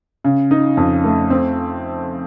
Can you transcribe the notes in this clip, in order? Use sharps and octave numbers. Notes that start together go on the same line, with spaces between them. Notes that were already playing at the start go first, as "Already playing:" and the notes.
C#3
D#4
F2
A3
C4